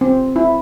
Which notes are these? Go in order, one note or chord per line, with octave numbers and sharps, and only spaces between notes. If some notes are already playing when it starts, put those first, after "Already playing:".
C4
E4